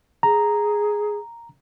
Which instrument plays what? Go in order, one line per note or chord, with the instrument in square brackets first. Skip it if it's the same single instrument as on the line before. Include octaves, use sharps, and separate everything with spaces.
[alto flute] G#4 [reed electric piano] A#5